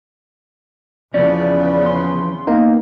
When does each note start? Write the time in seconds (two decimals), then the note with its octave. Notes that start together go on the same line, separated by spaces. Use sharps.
1.14 E2 C#3 E3 F3 B3 C#4 D5
1.86 C6
2.47 A#3 B3 D#4